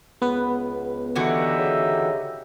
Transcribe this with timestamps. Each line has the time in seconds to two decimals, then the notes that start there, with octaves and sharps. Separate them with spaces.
0.22 C#2 B3 B4
1.16 D3 E3 D#4 F#4 G4 E5
1.58 C#3